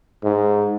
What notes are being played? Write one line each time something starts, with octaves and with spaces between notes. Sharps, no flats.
G#2